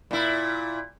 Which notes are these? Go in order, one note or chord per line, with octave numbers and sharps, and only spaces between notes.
A#2 E4